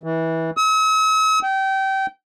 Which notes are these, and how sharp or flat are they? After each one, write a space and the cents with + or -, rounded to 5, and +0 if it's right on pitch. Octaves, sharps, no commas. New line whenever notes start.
E3 -20
E6 -45
G5 -25